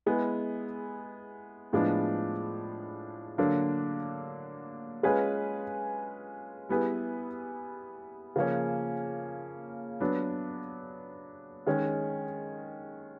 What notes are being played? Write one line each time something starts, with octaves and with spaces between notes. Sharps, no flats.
G#3 B3 E4 G#4
A2 F3 G#3 B3 D4
D3 F#3 A#3 D4
G#3 C#4 F4 G#4 B4
G3 B3 E4 G#4 B4
C#3 F3 A#3 C#4
F#3 B3 D4
D#3 G#3 C#4